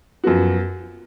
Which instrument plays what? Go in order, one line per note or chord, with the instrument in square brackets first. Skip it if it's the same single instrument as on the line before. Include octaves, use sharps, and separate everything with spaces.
[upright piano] F#2 F3 B3 F#4